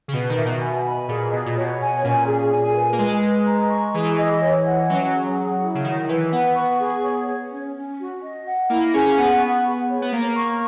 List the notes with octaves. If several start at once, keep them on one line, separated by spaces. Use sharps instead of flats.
C#3
B2 B4
D#3
A#2 E5
B2
G#5
B5
A#2 G#4
B2 D#5
A#2
B2 C#5
G#5
A#2 C#4
G#4
G#5
B4
A#3
G#3 B4
D#5
A#5
C#6
E3 G#4
D#5
C#5
F#5
F#3 C#4
G#4
F#5
E4
C#3
D#3 E4
E3 B4
B3 F#5
C#6
G#4
C#5
C#5
C#4
C#4
F#4
D#5
F#5
A#3 E4
C#4 G#4
B3 F#5
C#6
G#4
C#5
B3
A#3 A#5
C#6